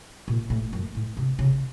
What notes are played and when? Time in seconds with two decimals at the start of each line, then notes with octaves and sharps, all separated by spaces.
0.28 A#2
0.50 A2
0.73 F#2
0.95 A2
1.17 C3
1.39 C#3